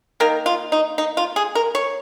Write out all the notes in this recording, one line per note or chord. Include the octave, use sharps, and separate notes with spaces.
D#3 A#3 A#4
F4
D#4
D#4
F4
G#4
A#4
C#5